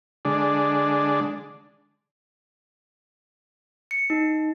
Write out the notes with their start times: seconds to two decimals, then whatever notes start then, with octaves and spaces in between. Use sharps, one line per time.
0.25 D3 G#3 D4
3.91 C#7
4.10 D#4